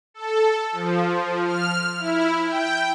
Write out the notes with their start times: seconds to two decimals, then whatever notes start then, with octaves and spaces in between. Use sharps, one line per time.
0.14 A4
0.72 F3
1.45 F6
1.99 E4
2.47 G5